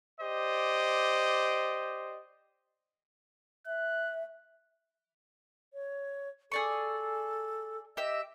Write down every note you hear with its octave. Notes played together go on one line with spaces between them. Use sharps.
G4 C5 D5 D#5
E5 F#6
C#5
G#4 A4 D5 C#6
G4 D#5 E5